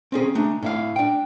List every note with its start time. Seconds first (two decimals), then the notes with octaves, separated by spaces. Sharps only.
0.12 C4 C#4 G#4
0.35 A3 D4 D#4
0.63 A2 E5 F5
0.96 D4 G5